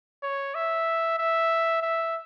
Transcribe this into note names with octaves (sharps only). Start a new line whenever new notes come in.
C#5
E5
E5
E5